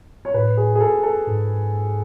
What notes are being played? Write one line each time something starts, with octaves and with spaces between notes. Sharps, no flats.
C#5
A2 B4
G#4
G#4
A4
A4
G#2